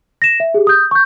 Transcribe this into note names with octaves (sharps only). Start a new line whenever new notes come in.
A#6 E7
E5
G4 G#4
D#6 G6
C#6 G6